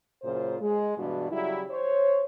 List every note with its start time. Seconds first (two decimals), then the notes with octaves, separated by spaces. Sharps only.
0.23 F#2 A#2 C#3 F4 C5
0.60 G#3
0.98 G2 B2 E3 D4 F#4
1.31 C#3 F#3 G3 E4
1.70 C5 C#5